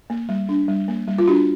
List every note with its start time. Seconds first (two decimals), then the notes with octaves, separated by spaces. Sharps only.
0.10 A#3
0.29 G3
0.49 D4
0.68 G3
0.88 A#3
1.08 G3
1.19 F4
1.27 D4 F#4